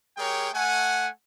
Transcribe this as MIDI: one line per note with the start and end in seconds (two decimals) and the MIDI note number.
0.17 0.49 56
0.17 0.49 67
0.17 0.49 68
0.17 0.49 70
0.17 0.49 73
0.17 0.49 79
0.54 1.09 57
0.54 1.09 78
0.54 1.09 80